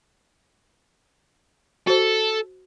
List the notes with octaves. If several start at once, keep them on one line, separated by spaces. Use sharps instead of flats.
F#4 A4 C5